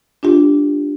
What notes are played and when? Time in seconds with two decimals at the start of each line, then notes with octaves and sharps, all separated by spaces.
0.23 D4 F4 G4